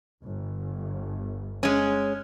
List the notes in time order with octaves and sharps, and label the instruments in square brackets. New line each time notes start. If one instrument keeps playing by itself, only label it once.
[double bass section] G1
[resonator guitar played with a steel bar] G#3 C#4